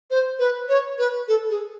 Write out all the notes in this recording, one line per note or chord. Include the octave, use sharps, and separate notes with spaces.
C5
B4
C#5
B4
A4
G#4